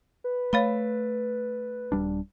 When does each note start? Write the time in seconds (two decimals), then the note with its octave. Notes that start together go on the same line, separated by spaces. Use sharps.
0.24 B4
0.53 A3 C#5 F5 B5
1.92 D#1 G3 D4